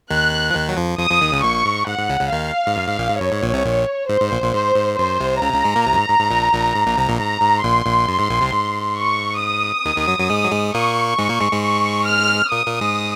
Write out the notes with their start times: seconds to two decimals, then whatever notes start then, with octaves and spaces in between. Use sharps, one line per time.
0.10 D#2 D#3 F#6
0.50 F3
0.55 D#2 D#3
0.69 F#3
0.77 F2 F3
0.99 F2 F3 D#6
1.10 F2 F3
1.21 D#2 D#3
1.32 C#2 C#3
1.43 A#1 A#2 C#6
1.65 G#2
1.87 G#2 F#5
1.99 G#2
2.09 C#2 C#3
2.20 C#2 C#3
2.32 D#2 D#3 F5
2.67 G#2
2.77 F#2
2.88 G#2
2.98 A#1 A#2
3.09 G#2
3.20 F#2 C#5
3.32 G#2
3.43 A#1 A#2
3.54 C2 C3
3.65 A#1 A#2
4.09 G#2 C5
4.21 G#2
4.31 A#1 A#2
4.42 A#1 A#2
4.53 G#2 C5
4.76 G#2
4.97 F#2 C5
5.20 C2 C3
5.42 C#2 C#3 A#5
5.49 C3
5.53 C#2 C#3
5.64 G#2 G#3
5.76 A#2 A#3
5.87 C2 C3
5.92 F#2
5.98 G#2
6.09 G#2
6.20 G#2
6.31 A#1 A#2
6.53 A#1 A#2
6.75 G#2
6.86 A#1 A#2
6.98 C2 C3
7.08 A#1 A#2
7.19 G#2 A#5
7.42 G#2
7.64 A#1 A#2 C6
7.86 A#1 A#2
8.08 F#2
8.19 G#2
8.30 A#1 A#2
8.41 C2 C3
8.53 G#2
8.97 C#6
9.42 D#6
9.85 D#2 D#3
9.96 D#2 D#3
10.08 F#2 F#3
10.19 F#2 F#3
10.29 G#2 G#3
10.44 F#3
10.51 G#2 G#3
10.74 A#2 A#3 C#6
11.18 G#2 G#3
11.29 A#2 A#3
11.40 G#2 G#3
11.52 G#2 G#3
11.62 C#6
12.07 F6
12.51 A#2 A#3 D#6
12.66 A#2 A#3
12.81 G#2 G#3